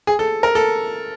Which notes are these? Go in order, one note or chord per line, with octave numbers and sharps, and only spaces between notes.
G#4
A4
A#4
A4